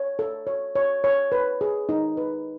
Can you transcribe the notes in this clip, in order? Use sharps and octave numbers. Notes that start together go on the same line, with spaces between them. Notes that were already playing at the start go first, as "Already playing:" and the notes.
Already playing: C#5
A4
C#5
C#5
C#5
B4
G#4
D#4
B4